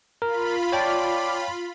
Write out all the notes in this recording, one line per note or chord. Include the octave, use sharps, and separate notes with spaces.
F4 A#4 B5
C#5 D5 G5 A5